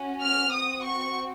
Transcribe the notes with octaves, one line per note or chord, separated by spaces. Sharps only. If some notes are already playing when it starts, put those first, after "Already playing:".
Already playing: C#4 F#4
F6
C4 F#4 D#6
C#6